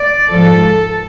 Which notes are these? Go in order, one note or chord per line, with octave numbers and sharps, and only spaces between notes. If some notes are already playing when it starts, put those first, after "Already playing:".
Already playing: D5
G#2 F3 A4